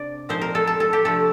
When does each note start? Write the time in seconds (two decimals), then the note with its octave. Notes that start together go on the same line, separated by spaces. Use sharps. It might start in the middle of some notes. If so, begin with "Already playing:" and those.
Already playing: C3 D4 D5
0.29 A#2 F3 C4 D#4 C5
0.41 A#4
0.55 A4
0.67 A4
0.80 A4
0.93 G4
1.05 C3 F3 A3 D4 A4